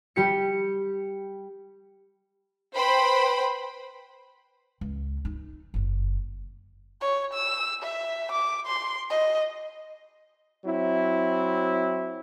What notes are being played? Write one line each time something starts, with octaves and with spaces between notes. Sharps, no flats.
G3 G4 C#7
B4 C5 G5 B5
C#2
D#4
F#1 D3
C#5
E6
E5
D6
C6
D#5
F#3 C4 E4